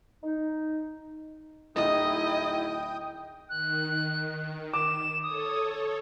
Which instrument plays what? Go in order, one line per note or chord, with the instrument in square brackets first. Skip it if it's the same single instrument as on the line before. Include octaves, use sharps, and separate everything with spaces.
[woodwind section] D#4
[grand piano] D1 D#4 [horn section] E4 [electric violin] D#5 [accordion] G5 D#6
[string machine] D#3 [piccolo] F#6
[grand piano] D6 [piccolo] E7
[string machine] A4 C#5 [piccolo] D#6